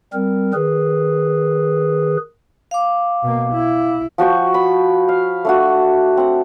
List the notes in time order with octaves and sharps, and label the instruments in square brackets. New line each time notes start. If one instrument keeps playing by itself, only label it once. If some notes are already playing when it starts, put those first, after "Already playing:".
[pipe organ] G3 C4 A#4
D#3 G#4 B4
[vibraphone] F5 D6
[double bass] B2 A#3
E4
[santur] F3 F#4 G5 C#6
B5
F5
A3 D4 F#4
C4 F#5